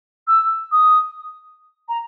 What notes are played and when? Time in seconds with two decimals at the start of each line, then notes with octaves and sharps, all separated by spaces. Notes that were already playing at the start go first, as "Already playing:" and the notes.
0.28 E6
0.72 D#6
1.89 A#5